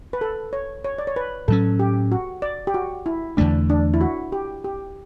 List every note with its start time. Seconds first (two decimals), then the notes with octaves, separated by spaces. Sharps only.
0.13 B4
0.21 A4
0.53 C#5
0.84 C#5
0.99 D5
1.07 C#5
1.16 B4
1.48 A2 F#3 C#4 A4
1.79 G4
2.12 F#4
2.42 D5
2.67 G4
2.74 F#4
3.06 E4
3.37 E2 D3 A3 D4
3.70 D4
3.94 E4
4.01 F#4
4.32 G4
4.64 G4